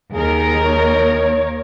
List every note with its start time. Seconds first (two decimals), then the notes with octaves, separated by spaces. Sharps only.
0.13 D#2 D#4 G#4 A#4
0.64 C#5